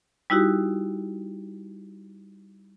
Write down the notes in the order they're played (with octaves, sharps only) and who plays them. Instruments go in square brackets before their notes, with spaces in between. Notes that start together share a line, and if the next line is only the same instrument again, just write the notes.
[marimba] G3 D#4 E4 F#4 G4